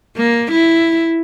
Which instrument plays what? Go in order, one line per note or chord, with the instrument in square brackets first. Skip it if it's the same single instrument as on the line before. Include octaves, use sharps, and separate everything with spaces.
[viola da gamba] A#3
E4